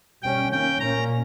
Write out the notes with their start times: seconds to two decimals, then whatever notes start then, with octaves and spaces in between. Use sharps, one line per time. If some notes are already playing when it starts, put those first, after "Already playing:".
0.23 B2 G3 C#4 G5
0.51 D#3 A#3 C#4 G5
0.80 A#2 A#3 C#4 A#5